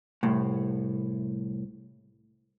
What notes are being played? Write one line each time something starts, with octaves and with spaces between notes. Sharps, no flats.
C2 A2